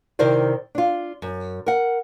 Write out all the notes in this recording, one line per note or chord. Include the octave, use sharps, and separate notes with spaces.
C3 D#3 E4 A#4 C5 D5
D4 F4
F#2
A#4 F#5